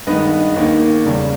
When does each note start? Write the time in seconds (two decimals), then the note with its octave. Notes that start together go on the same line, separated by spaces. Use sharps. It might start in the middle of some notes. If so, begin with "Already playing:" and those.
0.07 G2 D#3 G#3 B3 B4 D#5
0.56 D#2 D#3 A#3
1.05 E2 C#3 G3